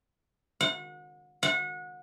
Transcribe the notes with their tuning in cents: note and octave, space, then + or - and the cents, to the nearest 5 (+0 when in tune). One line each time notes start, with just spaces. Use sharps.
F#5 -35
F#5 -30